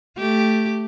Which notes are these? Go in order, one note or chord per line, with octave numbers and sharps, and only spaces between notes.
A3 G4